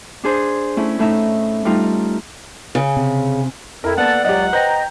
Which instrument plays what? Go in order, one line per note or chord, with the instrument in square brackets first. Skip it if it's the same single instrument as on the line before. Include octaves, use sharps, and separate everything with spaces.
[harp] D4 G#4 C5
A3 C#4 E4
A2 A3 D#4 E5
G3 A3 D#4 F4
[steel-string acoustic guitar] C#3
[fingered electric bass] C3
[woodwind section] F2 [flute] E4 [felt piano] A#4
[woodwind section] A#3 A4 A5 [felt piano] B3 [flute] D5 [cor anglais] F#5
[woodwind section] C#2 F#3 [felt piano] G4 D#5 [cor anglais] F#5
[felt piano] B4 C5 G6 [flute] D#5 [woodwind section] G5 A#5